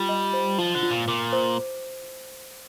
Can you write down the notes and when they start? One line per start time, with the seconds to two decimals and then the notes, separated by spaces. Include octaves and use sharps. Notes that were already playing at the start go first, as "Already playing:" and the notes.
Already playing: G3 F4
0.09 D#5
0.33 C5
0.58 F3 F4
0.75 D3
0.83 F4
0.91 A#2
1.08 A#2 D6
1.32 C5